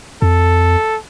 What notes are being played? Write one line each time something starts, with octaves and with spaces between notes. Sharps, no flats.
F2 A4